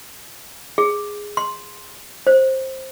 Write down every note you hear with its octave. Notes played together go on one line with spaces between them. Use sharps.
G#4
C6
C5